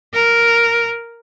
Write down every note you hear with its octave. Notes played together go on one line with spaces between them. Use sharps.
A#4